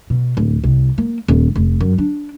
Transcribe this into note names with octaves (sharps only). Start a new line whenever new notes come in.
B2
D1
C2
A#3
D#1
F1
F#2
D4